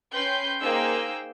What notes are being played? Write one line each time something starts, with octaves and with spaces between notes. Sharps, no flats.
C#4 B4 G5 C6 G6 C7
A#3 D#4 G#4 C5 G5 E6